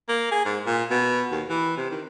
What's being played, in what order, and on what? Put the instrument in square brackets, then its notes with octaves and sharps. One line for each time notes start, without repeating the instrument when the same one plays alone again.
[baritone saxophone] A#3
G#4
G#2
A#2
B2
D#2
E3
C3
D#3